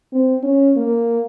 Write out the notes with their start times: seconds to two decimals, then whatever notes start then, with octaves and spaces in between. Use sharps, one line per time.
0.12 C4
0.43 C#4
0.76 A#3